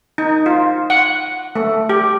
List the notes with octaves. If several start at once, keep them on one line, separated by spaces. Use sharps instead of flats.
D#4
F4
F#5
A3
G4